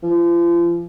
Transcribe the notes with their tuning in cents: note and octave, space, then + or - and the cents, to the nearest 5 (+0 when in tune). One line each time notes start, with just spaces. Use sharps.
F3 -35